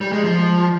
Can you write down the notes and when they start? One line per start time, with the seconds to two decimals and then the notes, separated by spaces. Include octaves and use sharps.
0.01 G3
0.12 G#3
0.24 F3